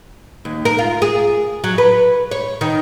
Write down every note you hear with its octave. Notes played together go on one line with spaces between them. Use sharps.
D#2
A#4
F4
G#4
F#3
B4
C#5
D#3